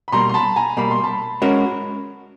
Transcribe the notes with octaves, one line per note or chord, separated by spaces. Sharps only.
B5
B2 G3 A#3 A#5 C6
C6
A5 B5
G#5 A#5
B2 G3 A#3 B5
C6
A5 B5
G#3 C#4 F#4 A#4